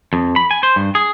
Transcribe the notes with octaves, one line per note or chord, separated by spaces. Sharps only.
F2
B5
G#5
C5
G2
G#4